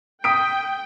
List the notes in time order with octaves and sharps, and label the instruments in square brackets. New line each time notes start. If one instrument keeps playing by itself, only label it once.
[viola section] G5 [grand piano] D#6 B6 D7